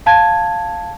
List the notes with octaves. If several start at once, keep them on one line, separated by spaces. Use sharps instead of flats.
F5 A5 G#6